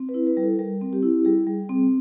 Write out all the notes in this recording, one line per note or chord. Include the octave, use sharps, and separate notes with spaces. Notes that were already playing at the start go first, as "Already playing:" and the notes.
Already playing: C4
B4
E4
B4
G3
A4
G3 A#4
C4
G4
E4
G3 G#4
G3
C4